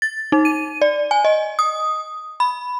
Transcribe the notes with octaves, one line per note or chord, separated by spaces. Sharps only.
A6
D#4
D#7
D5
G#5
D#5
D#6
B5